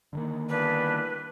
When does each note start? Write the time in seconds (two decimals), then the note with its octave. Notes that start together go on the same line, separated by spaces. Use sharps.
0.13 D3 D#3 A#3
0.49 E2 G2 D4 B4